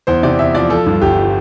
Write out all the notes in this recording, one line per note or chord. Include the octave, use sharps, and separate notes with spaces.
E2 C5
C3 D5
E2 E5
F3 D5
F3 A4
G2
G1 G4